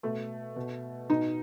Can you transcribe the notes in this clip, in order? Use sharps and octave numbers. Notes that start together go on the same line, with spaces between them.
B2 A3
B2
B2 D#4